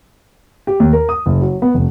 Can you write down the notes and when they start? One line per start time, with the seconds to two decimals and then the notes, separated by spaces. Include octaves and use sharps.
0.67 G4
0.80 D#2
0.93 A#4
1.09 D#6
1.26 F#1
1.41 F#3
1.62 B3
1.74 F1